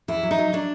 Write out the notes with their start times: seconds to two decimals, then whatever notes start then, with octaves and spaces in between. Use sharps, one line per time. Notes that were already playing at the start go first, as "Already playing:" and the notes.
0.08 E2 E4
0.23 F#3
0.31 D#4
0.38 F#3
0.53 F#3 D4